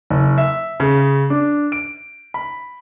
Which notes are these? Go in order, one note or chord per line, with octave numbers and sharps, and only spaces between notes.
F#1
E5
C#3
D4
D7
B5